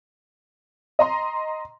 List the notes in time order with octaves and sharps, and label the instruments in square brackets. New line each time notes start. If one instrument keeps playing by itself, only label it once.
[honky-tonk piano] D#5 A#5 C6